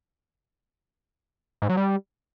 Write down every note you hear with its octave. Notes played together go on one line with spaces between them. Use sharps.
G#2
F#3
G3